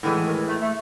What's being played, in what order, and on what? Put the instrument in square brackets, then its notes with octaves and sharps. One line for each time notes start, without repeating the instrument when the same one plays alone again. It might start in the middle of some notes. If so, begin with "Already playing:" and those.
[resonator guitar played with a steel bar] A2 E3 G#3 [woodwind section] D3
[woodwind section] D#3
A3
A3